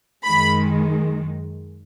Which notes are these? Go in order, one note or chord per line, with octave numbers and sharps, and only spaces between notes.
F#2 D#3 G#3 B5